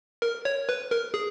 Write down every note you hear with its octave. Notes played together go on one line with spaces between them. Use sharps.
A#4
C#5
B4
A#4
G#4